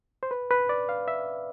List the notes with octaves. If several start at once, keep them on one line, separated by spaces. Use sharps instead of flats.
C5
B4
B4
D5
F5
E5